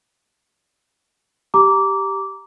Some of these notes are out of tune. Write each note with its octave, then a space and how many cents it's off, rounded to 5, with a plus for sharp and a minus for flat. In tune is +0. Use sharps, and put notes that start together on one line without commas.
G4 +0 A#5 +0 D6 -15